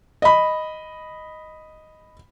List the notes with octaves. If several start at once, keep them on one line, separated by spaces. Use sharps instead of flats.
D#5 B5